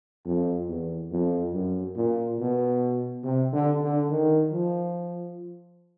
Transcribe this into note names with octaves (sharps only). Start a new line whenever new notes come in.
F2
E2
F2
F#2
A#2
B2
C3
D3
D3
D#3
F3